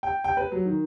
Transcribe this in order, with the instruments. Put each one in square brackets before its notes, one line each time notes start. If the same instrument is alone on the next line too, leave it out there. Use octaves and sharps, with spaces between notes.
[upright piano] G5
G5
B4
F#3
D#3